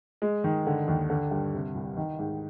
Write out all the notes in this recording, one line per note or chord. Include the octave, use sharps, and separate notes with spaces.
G#3
D#3
D3
D#2
D3
G2
C3
C2
D#3
G#2